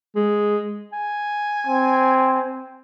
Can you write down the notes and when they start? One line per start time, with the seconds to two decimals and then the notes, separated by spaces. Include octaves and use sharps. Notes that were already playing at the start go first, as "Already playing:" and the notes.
0.16 G#3
0.92 G#5
1.67 C4